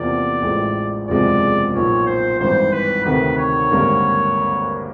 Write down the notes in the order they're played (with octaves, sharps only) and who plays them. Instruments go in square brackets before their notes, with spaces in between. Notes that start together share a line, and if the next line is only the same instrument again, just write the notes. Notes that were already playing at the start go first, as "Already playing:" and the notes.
Already playing: [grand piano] E2 C3 F3 A#3 [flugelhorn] D5
[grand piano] A1 A2 F3 G#3
[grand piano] F#1 E2 C3 F3 G#3 [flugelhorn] D5
[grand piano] B1 A#2 F3 [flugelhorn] C#5
[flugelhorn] C5
[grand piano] G#1 G2 E3 [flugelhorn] C5
[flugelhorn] B4
[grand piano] D2 C3 D#3 [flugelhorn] B4
[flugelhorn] C#5
[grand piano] G#1 G2 D3 G3 A#3